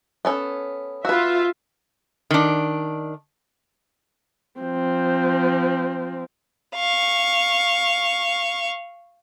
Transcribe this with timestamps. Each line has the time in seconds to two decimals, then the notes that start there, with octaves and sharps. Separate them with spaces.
0.25 B3 C#4 A4
1.05 F4 F#4 B4 E5
2.31 D#3 D4
4.61 F3 C4
6.76 F5 C#6